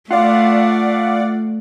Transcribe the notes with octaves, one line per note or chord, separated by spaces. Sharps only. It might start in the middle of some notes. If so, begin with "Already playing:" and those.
A3 F4 D5 F5 F#5